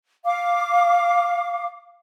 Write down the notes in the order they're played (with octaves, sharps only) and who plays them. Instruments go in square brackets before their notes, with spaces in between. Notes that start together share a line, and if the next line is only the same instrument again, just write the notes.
[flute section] F5 D6